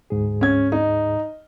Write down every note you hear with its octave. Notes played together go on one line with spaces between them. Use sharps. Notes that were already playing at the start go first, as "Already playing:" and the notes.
D2 G#2 G#4
C#4 G#6
D#4